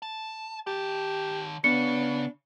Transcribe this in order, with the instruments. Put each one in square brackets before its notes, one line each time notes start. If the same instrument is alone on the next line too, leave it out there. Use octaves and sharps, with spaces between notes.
[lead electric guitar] A5
[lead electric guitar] D#3 A5 [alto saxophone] G4
[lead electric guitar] C#3 [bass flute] B3 [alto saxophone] D4 [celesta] C#7